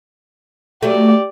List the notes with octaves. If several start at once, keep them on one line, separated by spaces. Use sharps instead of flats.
F#3 A3 G4 D5